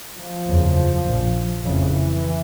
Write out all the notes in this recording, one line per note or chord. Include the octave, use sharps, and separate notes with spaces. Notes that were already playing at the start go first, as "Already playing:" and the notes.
F3
F#1 E2 C#3
A#1 A#2
F1 F2 C#3 E3